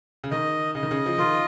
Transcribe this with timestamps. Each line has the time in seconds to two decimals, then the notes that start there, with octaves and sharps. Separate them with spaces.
0.24 C#3
0.31 D#3 D#5
0.75 C#3 D#5
0.83 D#3
0.91 C#3
1.06 F3
1.18 D#3 F4